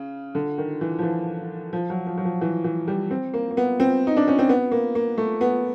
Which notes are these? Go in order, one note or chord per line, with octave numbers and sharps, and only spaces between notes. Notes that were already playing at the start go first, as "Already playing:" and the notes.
Already playing: C#3
D3
D#3
E3
F3
E3
F3
F#3
F3
F#3
F3
E3
E3
G3
C4
A#3
A#3
B3
C4
D#4
D4
C#4
C4
B3
A#3
A#3
A3
B3